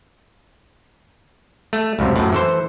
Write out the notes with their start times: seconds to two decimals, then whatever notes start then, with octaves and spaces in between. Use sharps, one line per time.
1.73 A3
1.99 C#2 F#2 A2 C3
2.16 F#2 A2
2.32 E3 A4 C5